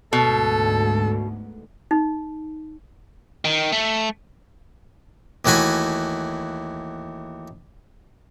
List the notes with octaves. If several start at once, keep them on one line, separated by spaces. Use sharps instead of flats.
D2 G#2 B2 A4
D#4
D#3
A3
D#2 E3 A3 F#4 G#5 B5